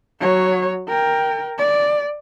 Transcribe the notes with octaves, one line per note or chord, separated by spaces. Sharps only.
F#3 C#5
A#4 G5
D5